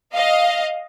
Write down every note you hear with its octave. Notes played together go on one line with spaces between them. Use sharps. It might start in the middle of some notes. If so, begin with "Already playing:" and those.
D#5 F5